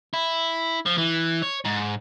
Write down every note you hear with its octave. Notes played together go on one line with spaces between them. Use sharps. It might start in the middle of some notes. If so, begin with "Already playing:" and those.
E4
F3
E3
C#5
G#2